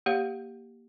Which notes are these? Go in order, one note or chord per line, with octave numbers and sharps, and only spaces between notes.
A#3 G4 C#5 F5